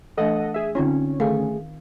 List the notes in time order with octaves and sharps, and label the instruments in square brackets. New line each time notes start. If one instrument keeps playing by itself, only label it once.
[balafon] E3 A3 D4 [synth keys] A4 D#5 F#5
[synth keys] G#4 E5
[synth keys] D3 C#4 [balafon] C4 D#4 F4
[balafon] D#3 F5 [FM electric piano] A3 G#4